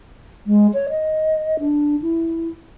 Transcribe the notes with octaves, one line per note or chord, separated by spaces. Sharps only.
G#3
C#5
D#5
D4
E4